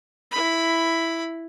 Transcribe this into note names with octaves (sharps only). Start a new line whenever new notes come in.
E4 B5